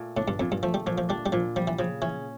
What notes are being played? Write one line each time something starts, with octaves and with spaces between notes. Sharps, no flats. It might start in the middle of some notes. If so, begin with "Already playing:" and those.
Already playing: A#2 A3
A2 D4
G2
F2 A#2
G2
F3 A3
G3
A#2 F3
F3
G3 D4
G3
A#2 F3
F3 G3
E3
C#3 F3
E3 C#4